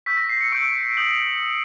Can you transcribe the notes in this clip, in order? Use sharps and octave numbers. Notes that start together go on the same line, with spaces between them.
C#6 E6 G6 B6
A#6
C7
C#7
C#6 E6 G6 D7
D#6 G6 F#7